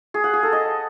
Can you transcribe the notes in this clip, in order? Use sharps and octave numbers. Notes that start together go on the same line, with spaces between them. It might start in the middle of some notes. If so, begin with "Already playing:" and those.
G#4
F#5
G#4
A4
D#5